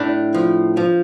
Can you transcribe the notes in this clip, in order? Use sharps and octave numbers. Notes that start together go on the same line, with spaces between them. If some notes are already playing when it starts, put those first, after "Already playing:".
Already playing: A2 D4
F3
F3